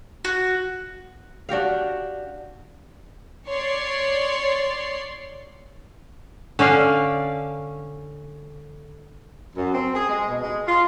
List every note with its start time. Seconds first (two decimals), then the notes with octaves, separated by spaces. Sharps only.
0.25 F#4
1.49 D4 F#4 G4 F5
3.48 C#5 D5 C6
6.59 D3 C#4 D5 F5
9.56 F#2
9.74 C4
9.94 G#4
10.08 G#3
10.27 B2
10.42 G#3
10.66 F4